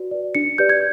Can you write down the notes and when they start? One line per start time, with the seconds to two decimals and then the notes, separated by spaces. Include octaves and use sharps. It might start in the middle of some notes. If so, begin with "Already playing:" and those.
Already playing: F#4 B4 D5
0.11 B4 D5
0.35 D4 C#7
0.58 G4 B4 D5 G6
0.69 G#6